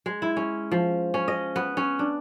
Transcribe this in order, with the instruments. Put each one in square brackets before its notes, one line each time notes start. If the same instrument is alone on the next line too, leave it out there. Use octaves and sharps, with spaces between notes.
[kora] G#3
E4
C#4
F3
C#4
D#5
B3
C#4
D4